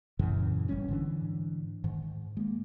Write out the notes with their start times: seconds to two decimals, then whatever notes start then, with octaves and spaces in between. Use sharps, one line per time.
0.19 F#2 A#2 C#3 E3
0.69 G1 G3 C#4
0.88 G#2 D3 E3 D4
1.84 G#2 D#3
2.37 G#3 A#3